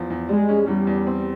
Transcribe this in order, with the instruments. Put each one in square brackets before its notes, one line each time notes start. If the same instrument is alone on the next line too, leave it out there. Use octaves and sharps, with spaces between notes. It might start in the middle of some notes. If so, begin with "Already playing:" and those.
Already playing: [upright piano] E2 F3
E2
[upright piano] G3 [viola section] G#3
[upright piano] C#4
[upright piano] E2 [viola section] G3
[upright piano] E2
C4